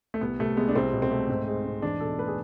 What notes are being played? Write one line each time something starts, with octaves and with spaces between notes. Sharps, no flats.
A3
C2 B3
C3 A3
G#3 B3
D4
C2 C4
B2
C4
A3
G#2
G#3
G#2
E2 D4
B2 A4
A3 B4
G#4